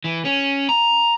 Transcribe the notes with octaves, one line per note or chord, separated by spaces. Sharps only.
E3
C#4
A#5